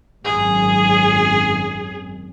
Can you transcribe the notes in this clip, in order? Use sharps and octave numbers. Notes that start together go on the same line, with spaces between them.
G#1 F#2 G#4